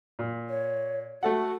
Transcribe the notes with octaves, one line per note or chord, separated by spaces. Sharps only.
A#2
C#5
A3 F#4 A4 F#5